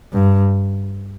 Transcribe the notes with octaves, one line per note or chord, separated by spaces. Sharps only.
G2